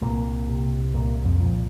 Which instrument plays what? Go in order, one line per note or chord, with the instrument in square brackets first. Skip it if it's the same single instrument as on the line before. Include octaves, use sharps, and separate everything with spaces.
[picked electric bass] C2 A#2 A#3
C3
C2 A#2 A#3
F2 F3
A#2